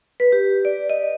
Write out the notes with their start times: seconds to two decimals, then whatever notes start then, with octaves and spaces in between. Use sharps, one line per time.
0.20 B4
0.32 G4
0.65 D5
0.90 D#5